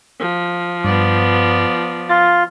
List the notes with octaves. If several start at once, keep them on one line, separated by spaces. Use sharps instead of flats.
F3
G2 B3 D5
F4 A6